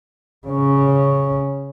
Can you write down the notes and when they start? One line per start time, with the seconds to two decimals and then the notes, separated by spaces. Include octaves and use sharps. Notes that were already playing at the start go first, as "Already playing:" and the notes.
0.47 C#3 C#4